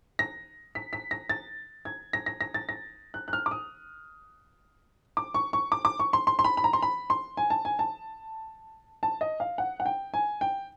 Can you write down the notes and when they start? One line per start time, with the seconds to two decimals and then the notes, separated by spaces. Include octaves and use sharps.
0.19 A#6
0.75 B6
0.93 B6
1.11 A#6
1.29 A6
1.85 G#6
2.13 A#6
2.26 A#6
2.41 A#6
2.54 A6
2.69 A#6
3.14 F#6
3.28 F#6
3.33 F6
3.46 D6
3.51 D#6
5.17 D6
5.34 C#6
5.53 C#6
5.72 D6
5.85 D6
6.00 C#6
6.13 C6
6.27 C6
6.39 C6
6.44 B5
6.57 B5
6.64 A#5
6.73 C6
6.82 B5
7.10 C6
7.37 G#5
7.50 A5
7.65 G#5
7.79 A5
9.03 A5
9.21 D#5
9.40 F5
9.58 F#5
9.80 F#5
9.86 G5
10.14 G#5
10.41 G5